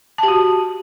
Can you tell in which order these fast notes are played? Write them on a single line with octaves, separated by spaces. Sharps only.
A5 G4 F#4